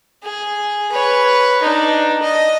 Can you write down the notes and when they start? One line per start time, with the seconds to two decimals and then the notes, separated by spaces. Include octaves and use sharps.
0.23 G#4
0.92 B4 C#5
1.63 D4 D#4
2.22 D#5